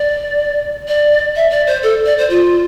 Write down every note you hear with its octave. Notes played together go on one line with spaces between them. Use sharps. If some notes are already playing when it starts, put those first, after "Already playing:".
Already playing: D5
D5
E5
D5
C5
A4
D5
C5
F4